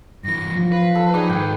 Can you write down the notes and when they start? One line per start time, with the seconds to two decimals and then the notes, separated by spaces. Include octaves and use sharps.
0.24 G2 E3 A#6
0.49 F3
0.72 B4 F5
0.95 A4
1.14 D#4 G4 G#4 B4 D5
1.30 G#2 D#3 G5